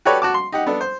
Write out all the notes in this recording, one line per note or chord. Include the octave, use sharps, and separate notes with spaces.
F#4 G4 A4 B4 C#5 D5
F#4 A5 D6
C6
D#4 G4 F#5
B3 D4 A4
C5